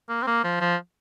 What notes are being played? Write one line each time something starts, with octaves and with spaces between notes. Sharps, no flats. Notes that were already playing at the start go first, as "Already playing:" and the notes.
A#3
C4
A#3
F3
F3